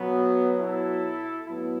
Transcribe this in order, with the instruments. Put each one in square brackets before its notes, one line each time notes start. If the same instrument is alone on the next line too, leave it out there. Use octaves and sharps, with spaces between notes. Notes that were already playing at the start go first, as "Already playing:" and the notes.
Already playing: [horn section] B2 F#3 B3
E4 A4
A2 F#3 B3 E4